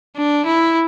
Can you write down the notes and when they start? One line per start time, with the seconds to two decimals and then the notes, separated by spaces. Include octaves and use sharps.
0.17 D4
0.46 E4